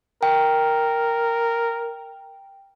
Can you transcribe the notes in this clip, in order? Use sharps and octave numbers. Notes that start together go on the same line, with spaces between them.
A#4 G5